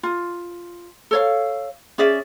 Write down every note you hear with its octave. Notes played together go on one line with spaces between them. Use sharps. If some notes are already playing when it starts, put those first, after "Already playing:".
F4
A4 C#5 F5
C#4 G#4 D5 E5